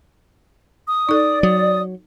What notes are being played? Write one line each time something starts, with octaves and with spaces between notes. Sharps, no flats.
D#6
D#4 A4 D5
F#3 D#6